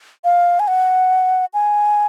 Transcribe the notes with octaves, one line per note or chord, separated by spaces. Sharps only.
F5
G#5
F#5
G#5